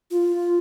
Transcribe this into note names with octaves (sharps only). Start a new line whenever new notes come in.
F4